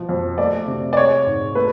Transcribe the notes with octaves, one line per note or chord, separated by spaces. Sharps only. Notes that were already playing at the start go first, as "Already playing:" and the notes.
Already playing: B2 F3
F2
A3 D5
C3
D5
G#3 C#5
G#2
A3 B4